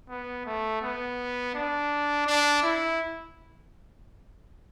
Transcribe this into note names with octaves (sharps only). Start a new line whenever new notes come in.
B3
A3
B3
D4
D4
E4